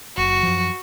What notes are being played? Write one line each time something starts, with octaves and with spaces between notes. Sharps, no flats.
F#1 F#4
F#2 F3